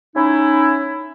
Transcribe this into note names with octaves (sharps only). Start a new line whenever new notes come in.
C#4 D#4 E4